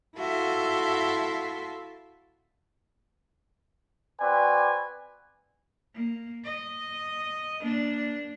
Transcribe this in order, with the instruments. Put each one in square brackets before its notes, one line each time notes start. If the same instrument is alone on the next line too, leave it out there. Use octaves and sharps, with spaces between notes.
[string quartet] E4 F#4 A4 E5 F5 C6
[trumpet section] C4 F#4 B4 D5 G#5
[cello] A#3
D#5
A#3 D4